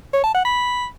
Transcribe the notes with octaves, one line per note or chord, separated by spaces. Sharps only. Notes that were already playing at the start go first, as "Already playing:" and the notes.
C#5
A5
F#5
B5